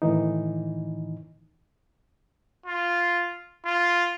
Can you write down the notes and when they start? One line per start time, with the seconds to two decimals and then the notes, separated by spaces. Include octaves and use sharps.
0.02 A2 D#3 E3 D#4
2.66 F4
3.65 F4